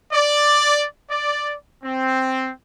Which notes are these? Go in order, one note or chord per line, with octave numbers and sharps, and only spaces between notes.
D5
D5
C4